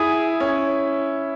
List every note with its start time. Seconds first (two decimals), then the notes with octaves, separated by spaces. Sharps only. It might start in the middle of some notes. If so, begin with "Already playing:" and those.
Already playing: E4 G#4
0.40 C#4